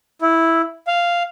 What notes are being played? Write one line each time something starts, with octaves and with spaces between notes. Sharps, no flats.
E4
F5